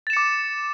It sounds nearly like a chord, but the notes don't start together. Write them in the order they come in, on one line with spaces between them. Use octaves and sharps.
A6 E7 C#7 D6